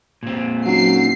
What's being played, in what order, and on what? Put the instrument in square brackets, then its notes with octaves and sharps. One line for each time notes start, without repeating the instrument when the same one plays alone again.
[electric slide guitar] A#2 C4
[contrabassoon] F#3 [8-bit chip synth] C#4 D#4 [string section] C7